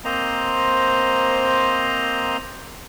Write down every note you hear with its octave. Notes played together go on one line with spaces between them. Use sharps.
A#3 C4 C5 D#5 A#5